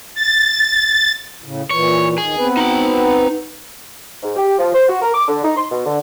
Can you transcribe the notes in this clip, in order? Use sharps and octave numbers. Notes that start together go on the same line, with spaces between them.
A6
A2 C#3
A#2 E3 C#5
D#2 D#3 G#4
B3 C4 B4
D#4 B5
G#2
G4
F3
C5
F#4
A#4
D6
D3
D#4
C6
B2
D3